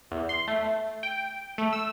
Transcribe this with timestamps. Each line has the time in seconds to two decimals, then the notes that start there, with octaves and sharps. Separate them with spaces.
0.11 E2
0.29 C6
0.48 A3
1.03 G5
1.58 A3
1.73 E6